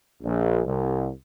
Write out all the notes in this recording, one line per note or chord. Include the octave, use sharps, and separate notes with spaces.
A#1
C2